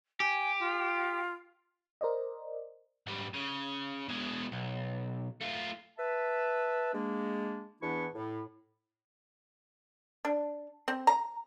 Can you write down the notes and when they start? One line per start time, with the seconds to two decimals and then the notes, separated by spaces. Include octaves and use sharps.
0.20 G4 G#5
0.60 F4
2.01 A#4 C5 D5 D#5
3.07 G#2 G3
3.34 C#3
4.09 B2 G#3
4.52 B1
5.41 A3 F4
5.98 B4 E5 A5
6.93 G#3 A#3 D4
7.82 E2 E3 B3 D4 E4 C#6
8.13 A2
10.25 D4
10.88 C4
11.07 A#5